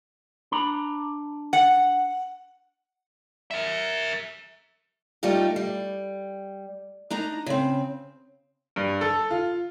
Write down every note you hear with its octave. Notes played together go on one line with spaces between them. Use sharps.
D4 A#5 B5
F#5
A#4 E5
G3 A3 D#4 F4 G4
G3
D4 D#4 A#5
C#3 C4
G2
A4
F4